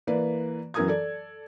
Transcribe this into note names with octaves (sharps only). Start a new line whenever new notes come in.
E3 A#3 B4 D5
F#2 E3 A#4 A#5 D#6 G#6
A4 D5